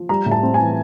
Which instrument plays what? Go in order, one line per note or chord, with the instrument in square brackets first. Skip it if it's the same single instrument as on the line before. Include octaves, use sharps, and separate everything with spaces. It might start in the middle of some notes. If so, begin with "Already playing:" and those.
Already playing: [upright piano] F3
G3 A#5
A2
A5
C4
G#5
E3